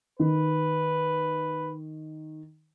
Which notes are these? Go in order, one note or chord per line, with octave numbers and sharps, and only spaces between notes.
D#3 B4